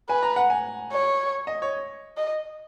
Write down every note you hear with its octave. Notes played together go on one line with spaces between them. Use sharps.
B4 G#5
A#5
F#5
G#5
C#5
D#5
C#5
D#5